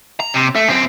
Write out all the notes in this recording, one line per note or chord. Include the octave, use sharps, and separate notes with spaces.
A#5
C3
A3
F#2 C4